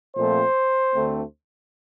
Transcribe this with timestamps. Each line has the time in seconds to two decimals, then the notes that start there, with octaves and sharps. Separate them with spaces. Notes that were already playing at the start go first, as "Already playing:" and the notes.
0.16 A#2 F3 A3 C4 C5
0.95 D2 D3 A3 C4